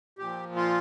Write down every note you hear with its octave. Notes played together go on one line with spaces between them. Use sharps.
A#2 F3 G4
F4